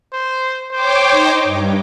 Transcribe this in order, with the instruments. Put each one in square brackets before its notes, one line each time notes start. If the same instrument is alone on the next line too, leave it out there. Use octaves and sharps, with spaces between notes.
[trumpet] C5
[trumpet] C5 [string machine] C#5 G5 D6
[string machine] D#4
G2